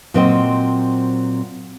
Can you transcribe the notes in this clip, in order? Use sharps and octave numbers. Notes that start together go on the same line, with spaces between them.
A#2 F#3 C4 C5 D#5 G5